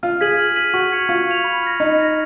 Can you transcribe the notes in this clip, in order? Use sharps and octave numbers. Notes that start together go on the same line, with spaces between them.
F4 F6
G#4 G#6 B6 D#7 F#7
F6
G#6 B6 D#7 F#7
F#4 C#6
G#6 C#7 F7
F4 C#6
G#6 C#7 F7
B5
F6 A#6
D#4 B5
F6 A#6